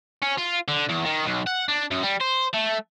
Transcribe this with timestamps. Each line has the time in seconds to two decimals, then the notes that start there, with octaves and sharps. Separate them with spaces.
0.22 C#4
0.38 F4
0.68 D3
0.89 E2
1.06 D#3
1.26 B1
1.47 F#5
1.69 D4
1.91 F#2
2.03 G3
2.20 C5
2.53 A3